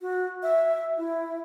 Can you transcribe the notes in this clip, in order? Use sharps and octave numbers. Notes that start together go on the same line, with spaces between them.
F#4
E5
E4